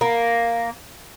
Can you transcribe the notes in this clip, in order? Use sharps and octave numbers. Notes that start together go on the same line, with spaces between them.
A#3